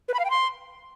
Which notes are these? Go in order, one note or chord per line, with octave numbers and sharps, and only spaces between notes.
B4
B5
F5
G5
C6